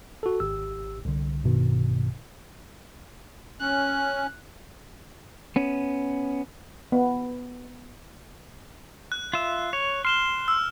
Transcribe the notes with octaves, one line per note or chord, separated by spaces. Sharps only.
F#4 A4
G#1 G4 E6
C2 D3
A#1 G2 B2 D#3
C#4 F#6
B3 C#4
B3
F#6
F4 E5
C#5
C6 F6 E7 G7
E6